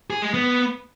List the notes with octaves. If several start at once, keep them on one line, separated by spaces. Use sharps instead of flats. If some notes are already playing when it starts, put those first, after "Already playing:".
G#4
G#3
B3